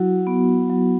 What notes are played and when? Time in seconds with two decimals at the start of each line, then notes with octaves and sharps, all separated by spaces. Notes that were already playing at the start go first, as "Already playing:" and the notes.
Already playing: F#3 E4 F#4
0.27 B3
0.70 F#3